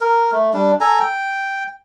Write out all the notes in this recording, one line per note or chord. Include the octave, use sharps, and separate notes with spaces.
A#4
A3
G3 D4
A4 G#5 A#5
G5